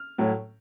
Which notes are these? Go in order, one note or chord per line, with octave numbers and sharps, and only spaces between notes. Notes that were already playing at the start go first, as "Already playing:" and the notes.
Already playing: F6
A2 F#3 A3